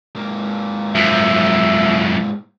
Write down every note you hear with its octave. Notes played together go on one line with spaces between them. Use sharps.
G#2 A#3
F#2 F3 E5